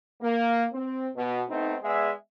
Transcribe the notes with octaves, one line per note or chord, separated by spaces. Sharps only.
A#3
C4
B2
A3 B3 C4 D#4
G#3 B3 G#4 D5 E5